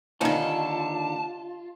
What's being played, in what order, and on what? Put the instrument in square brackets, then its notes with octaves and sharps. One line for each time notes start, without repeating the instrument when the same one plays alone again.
[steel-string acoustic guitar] D#2 D3 [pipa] G3 C#4 D#4 [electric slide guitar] F4 [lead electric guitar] A5